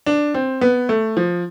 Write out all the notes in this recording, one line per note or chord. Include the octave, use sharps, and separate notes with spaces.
D4
C4
B3
A3
F3